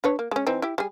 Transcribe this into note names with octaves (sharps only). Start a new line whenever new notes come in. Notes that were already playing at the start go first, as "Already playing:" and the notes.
D4 B4 C#5
A#3
G#3 C#4
E3 C4 D#4
E4 G4
G3 G#4